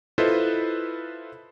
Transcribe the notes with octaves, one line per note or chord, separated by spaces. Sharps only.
E4 F4 A4 B4 C5 D#5